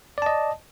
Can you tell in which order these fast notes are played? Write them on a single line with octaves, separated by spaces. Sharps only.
D5 A5 D#5